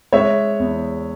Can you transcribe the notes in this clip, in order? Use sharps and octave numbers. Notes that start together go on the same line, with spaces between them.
G#3 C#5 E5
E2